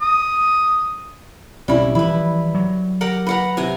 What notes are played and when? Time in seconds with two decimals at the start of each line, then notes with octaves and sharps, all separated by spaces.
0.01 D#6
1.68 B1 G3 C4 C#4 E4
1.95 E3 F3 E4 B4
2.54 F#3
3.01 G4 A#4 F#5
3.27 B4 F#5 A#5
3.57 C3 G#5 A#5